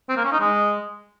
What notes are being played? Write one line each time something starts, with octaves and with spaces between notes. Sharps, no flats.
C4
A#3
C#4
D#4
G#3